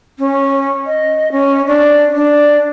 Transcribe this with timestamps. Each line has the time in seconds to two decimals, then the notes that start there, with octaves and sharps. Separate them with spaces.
0.19 C#4
0.86 D#5
1.32 C#4
1.67 D4
2.15 D4